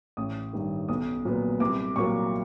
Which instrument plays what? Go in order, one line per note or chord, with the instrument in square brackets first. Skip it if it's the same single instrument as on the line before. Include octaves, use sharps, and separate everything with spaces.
[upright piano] A1 D#6
G2 D#3
B1 D#6
A#2 F#3 B3
C2 D6
A#2 F#3 A#3 C#6